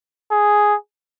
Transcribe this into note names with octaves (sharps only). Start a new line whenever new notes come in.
G#4